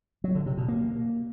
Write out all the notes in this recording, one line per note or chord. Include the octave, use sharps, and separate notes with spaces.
F#3
D3
C3
B2
A#3